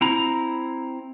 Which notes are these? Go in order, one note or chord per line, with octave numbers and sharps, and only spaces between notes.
C4 E4 A#5